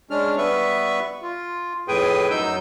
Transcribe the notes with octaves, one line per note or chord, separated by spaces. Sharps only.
G#3 C#4 D4 F6
G3 B3 B4 E5 C#6
F4
F2 A2 G#4 B4 G5 G#5
F#2 F#3 D#4 E6 G6